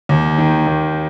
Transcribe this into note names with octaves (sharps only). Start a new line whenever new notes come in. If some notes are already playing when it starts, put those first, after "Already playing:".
D#2
D#3
D#2